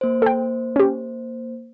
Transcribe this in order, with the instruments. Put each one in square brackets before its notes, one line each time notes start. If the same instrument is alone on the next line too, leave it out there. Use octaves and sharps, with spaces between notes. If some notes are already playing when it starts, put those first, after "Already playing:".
[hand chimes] A#3 C5
[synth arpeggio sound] A4 G5
C#4 G4